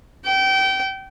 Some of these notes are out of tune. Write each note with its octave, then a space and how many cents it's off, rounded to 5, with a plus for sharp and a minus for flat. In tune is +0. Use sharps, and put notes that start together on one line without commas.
G5 -25